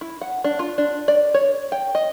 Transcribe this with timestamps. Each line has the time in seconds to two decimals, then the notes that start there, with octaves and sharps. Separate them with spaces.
0.01 E4
0.21 F#5
0.44 D4
0.59 F4
0.78 D4
1.08 D5
1.34 C#5
1.72 G5
1.95 D#5